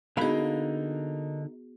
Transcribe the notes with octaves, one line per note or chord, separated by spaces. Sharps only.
D3 A#3 B3 D#4 F#4 G#4 F5 B5